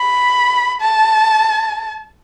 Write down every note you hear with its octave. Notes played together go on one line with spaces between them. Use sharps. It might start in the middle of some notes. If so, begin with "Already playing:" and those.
Already playing: B5
A5